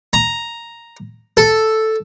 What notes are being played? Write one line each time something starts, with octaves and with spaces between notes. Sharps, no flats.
A#5
A4